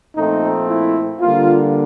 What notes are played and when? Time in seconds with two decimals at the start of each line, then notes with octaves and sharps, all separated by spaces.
0.16 A#2 F3 A3 C4 D#4
0.68 E4
1.21 D3 G3 A#3 F4